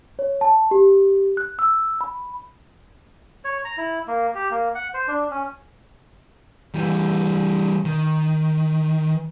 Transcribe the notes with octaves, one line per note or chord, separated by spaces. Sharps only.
C#5
A5
G4
F#6
E6
B5
C#5
A#5
E4
A#3
G4
A#3
F#5
C5
D4
C#4
E3 G3
D#3